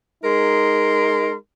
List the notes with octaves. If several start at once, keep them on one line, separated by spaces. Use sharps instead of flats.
G#3 D#4 A#4 C6